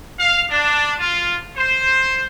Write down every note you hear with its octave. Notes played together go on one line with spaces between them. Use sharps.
F5
D4
F4
C5